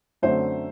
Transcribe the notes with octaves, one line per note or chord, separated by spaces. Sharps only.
F#2 D3 A3 C4 C5 E5